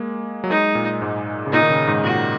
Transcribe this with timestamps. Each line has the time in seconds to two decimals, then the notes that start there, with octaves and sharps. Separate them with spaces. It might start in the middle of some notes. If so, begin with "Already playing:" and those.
Already playing: G#3 A#3
0.44 F#3
0.50 G#3 D#4
0.75 A#2
1.02 G#2
1.46 C#3
1.53 A#2 D#4
1.62 D#3
1.70 C#3
1.87 G#2
2.04 A#2 F#4